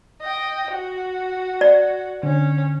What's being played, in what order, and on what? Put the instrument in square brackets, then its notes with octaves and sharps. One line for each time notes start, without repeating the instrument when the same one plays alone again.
[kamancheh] D#5 G5
F#4
[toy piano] D5
[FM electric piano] D3 [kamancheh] C#4